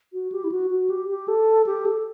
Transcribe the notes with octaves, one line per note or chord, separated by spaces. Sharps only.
F#4
G4
E4
F#4
F#4
G4
G4
A4
G4
A4